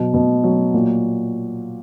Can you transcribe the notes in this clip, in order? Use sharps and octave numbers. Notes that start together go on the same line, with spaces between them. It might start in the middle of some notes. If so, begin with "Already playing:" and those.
Already playing: B2 F#3
B2
F#3
A#2